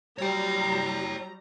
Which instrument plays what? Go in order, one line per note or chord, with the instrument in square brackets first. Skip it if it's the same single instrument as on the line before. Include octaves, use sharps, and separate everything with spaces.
[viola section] F#3 G3 A#5 [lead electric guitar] C#5 G5